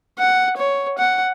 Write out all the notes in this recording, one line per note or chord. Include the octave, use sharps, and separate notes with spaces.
F#5
C#5
F#5